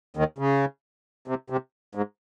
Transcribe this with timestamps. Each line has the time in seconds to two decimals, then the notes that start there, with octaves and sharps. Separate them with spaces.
0.17 D#2 D#3
0.38 C#3
1.28 C3
1.50 C3
1.95 G#2